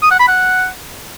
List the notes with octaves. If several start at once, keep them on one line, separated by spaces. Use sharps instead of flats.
D#6
F#5
B5
F#5